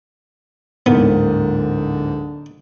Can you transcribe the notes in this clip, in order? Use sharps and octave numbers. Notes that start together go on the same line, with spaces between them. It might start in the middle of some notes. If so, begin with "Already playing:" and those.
D1 G#2 D3 A#3 B3